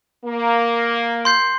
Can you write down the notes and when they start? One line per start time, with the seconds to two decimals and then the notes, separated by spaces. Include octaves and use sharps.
0.25 A#3
1.25 C6 G6 C7